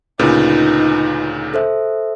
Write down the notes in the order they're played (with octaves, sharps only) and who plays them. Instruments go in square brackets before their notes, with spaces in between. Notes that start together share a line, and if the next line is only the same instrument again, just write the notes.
[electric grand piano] D2 A#2 C#3 [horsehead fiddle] D#4 [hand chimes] F4 B4
[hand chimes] A4 C5 E5